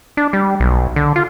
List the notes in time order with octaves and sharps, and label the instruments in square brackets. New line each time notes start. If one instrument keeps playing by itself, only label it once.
[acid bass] D4
G3
B1
D3
F4